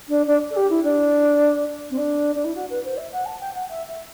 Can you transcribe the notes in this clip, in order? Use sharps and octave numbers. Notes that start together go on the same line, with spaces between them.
D4
D4
A4
G4
E4
D4
C4
D4
D4
E4
F#4
B4
C5
E5
F#5
A5
G5
F#5
E5
E5